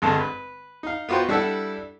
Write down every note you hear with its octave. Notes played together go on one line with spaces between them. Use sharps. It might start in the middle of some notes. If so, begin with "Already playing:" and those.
G#1 G2 D3 G#3 A5
B4
D#4 F5
B3 F4 F#4 C5 G5
G3 D4 E4 A4 F#5